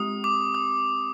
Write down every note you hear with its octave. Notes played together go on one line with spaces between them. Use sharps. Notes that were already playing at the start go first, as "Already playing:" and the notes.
Already playing: G#3 C4 G4 D#6
D6
D#6